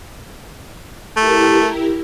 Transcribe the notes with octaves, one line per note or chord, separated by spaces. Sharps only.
A3 E4 G4 A#4